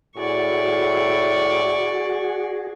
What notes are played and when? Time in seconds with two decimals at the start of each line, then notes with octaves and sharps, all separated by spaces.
0.17 A2 F#4 G#4 D5 C#6